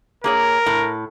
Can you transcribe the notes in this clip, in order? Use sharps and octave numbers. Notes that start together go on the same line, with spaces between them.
A#3 G#4 A#4 C#5
A2